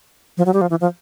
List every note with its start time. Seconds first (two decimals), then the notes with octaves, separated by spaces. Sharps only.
0.37 F3
0.46 F#3
0.54 G3
0.61 F3
0.70 E3
0.81 F3